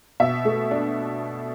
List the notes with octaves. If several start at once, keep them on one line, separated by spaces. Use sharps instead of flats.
B2 E5
A3
D4